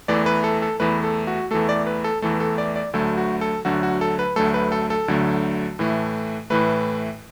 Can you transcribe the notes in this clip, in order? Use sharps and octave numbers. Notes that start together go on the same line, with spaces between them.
E2 E3 A3 D5
B4
A4
A4
E2 E3 A3 B4
A4
F#4
E2 E3 A3 A4
D5
B4
A4
E2 E3 A3 A4
A4
D5
D5
D2 D3 F#3 A3 A4
F#4
A4
D2 D3 F#3 A3 F#4
F#4
A4
B4
D2 D3 F#3 A3 A4
B4
A4
A4
D2 D3 F#3 A3
A2 E3 A3
A2 E3 A3 B4